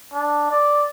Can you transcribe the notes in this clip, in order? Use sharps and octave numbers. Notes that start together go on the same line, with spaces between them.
D4
D5